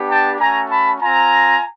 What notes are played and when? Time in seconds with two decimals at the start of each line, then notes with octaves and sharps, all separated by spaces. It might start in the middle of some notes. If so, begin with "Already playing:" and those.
Already playing: B3 D4 G4
0.10 G5 A5
0.40 A3 C#4 F#4 G#5 A#5
0.70 A5 B5
1.00 C4 F4 G#5 A#5